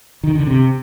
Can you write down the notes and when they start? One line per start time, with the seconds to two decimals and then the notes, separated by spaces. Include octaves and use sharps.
0.24 D#3
0.35 D3
0.47 C3